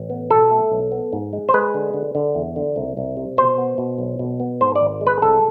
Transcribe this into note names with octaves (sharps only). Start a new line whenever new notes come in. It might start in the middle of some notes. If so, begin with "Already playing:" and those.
Already playing: A1
B3
B2 A4
A3
B1
B3
G#2
G#3
C5
G#3 B4
D3
D3
D3
E2
D3
C2
C2
C3
B2 C5
B3
B2
B1
B2
B3
G#2 C5
D5
G#1
G#3
B4
C2 A4